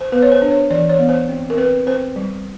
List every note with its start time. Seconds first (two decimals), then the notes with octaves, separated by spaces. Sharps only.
0.01 C5
0.12 B3 B4
0.22 C#5
0.32 C5
0.42 D4
0.51 C#5
0.70 E3 D5
0.89 C#5
0.99 B3
1.09 C5
1.29 C4
1.50 A#4
1.57 C4 B4
1.87 C4 C5
2.16 G3